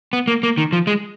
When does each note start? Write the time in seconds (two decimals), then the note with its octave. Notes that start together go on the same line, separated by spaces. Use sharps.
0.13 B3
0.28 A#3
0.43 A#3
0.58 D#3
0.73 F3
0.87 G#3